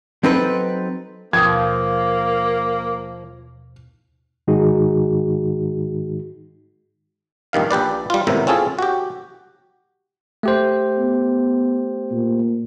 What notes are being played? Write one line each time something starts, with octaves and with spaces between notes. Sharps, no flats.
F#3 C4 D#4 A4 B4
D#2 B2 F3 A#3 D#6 G#6
G#2 D#3 G#3 D#4 F#4 G#4
A#1 G2 D#3 F5
A#1 G4 B4 D5
G3 F4
G#1 A2 C3 B3 A#4 E5
C4 C#4 F4 G#4 A4
F#4 G4
A3 G4 C5
B3
A#2